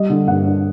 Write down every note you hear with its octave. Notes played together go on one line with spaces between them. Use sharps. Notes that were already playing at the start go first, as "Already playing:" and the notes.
Already playing: G3 D#5
D3
G2 F#5
D4